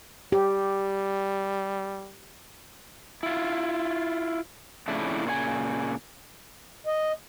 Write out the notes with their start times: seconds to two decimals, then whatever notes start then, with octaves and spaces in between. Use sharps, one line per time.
0.32 G3 G4
3.23 E4 F4
4.88 F2 A2 C#3 D4 E4
5.25 A#2 C#3 C5 G#5
6.87 D#5